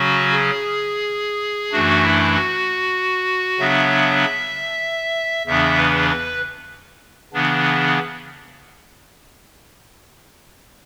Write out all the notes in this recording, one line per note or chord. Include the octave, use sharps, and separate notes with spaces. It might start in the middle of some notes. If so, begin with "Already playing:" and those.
Already playing: C#3 F#3 C#4 F#4
G#4
F#2 E3 A3 D4 F#4
E4
F#4
C#3 F#3 B3 D4 E5
E2 C#3 E3 B3 D4 E5
B4
B4
C#3 E3 B3 D4